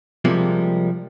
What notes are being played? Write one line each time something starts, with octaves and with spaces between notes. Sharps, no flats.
C3 F3 G3 G#3 A#3